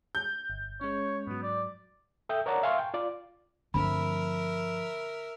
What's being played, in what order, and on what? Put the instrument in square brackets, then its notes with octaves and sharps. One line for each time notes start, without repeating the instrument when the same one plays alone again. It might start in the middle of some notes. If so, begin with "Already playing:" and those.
[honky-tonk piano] G6
[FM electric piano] G1
[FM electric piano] G#3 C#4 [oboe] C#5
[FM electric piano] G#2 F#3 [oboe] B3
[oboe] D5
[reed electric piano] A4 E5 G5 D#6 G6
A#4 C#5 D5 F#5 A5 A#5
E5 F5 G#5 A5 C6 C#6
G5
F4 D5
[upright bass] G2 F3 [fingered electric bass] D3 A3 C4 [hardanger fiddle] A#4 E5 [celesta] B5